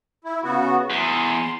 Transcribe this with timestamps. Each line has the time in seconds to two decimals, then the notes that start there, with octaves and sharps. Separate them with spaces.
0.24 E4
0.43 C#3 B3 F#4
0.90 E2 C6